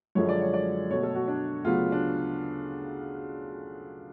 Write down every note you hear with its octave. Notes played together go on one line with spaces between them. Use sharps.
F#2 D3 F3 G#3 C#5
D5
C#5
D5
B2 A3 C#5
A4
F#4
D4
D2 C#3 F#3 B3 F4
D4